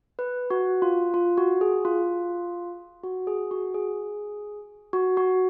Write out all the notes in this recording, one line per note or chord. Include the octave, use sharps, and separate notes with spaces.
B4
F#4
F4
F4
F#4
G#4
F4
F#4
G#4
F#4
G#4
F#4
F#4